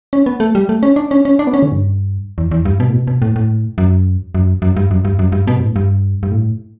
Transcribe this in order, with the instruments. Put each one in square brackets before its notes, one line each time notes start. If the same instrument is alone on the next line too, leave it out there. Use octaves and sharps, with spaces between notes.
[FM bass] C#4
B3
A3
G3
A3
C#4
D4
C#4
C#4
D4
B3
C#4
D3
G2
E2
E2
G2
B2
A2
B2
B2
A2
A2
F#2
F#2
F#2
G2
F#2
G2
F#2
G2
B2
G2
A2
G2
G2
A2